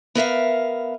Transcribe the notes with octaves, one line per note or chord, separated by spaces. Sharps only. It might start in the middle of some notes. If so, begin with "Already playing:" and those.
B3 A#4 E5 F5